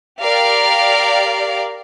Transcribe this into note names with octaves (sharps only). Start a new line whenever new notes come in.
G4 A#4 D5 F5